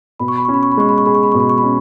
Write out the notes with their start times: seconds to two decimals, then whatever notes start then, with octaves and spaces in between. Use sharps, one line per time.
0.20 B2 B5
0.28 C#6
0.37 B5
0.45 C#4 C#6
0.54 B5
0.63 C#6
0.72 B5
0.77 G#3 C#6
0.89 B5
0.98 C#6
1.06 G#4 B5
1.15 C#6
1.23 B5
1.32 B2 C#6
1.40 B5
1.49 C#6
1.58 B5
1.63 C#4